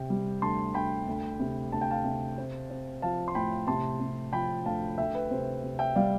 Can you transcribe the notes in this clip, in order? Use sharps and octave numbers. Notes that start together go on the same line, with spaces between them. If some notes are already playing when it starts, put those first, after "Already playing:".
Already playing: C3 G5
G3
D2 A5 C6
D2 G5 B5
D2
C3
D2 A5
G5
F5 A5
C3
C4
C4
F3 F5 A5
C6
A2 G5 B5
C3 A5 C6
C3
F3 G5 B5
D2 F5 A5
D2 E5 G5
B4
C3 C5
C3
E5 G5
G3 D5 F5